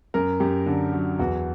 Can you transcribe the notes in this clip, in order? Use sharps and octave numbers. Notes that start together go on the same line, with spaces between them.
F#2 A#4
F#2 G4
D3
F#3
E2 F#4